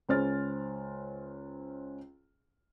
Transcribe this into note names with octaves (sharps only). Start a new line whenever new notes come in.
C#2 C#4 C5 F6 A6